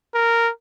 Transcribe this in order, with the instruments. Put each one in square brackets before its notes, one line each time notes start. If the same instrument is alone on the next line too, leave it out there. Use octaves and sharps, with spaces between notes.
[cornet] A#4